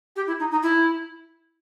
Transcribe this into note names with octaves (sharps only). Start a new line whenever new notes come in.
G4
E4
D#4
D#4
E4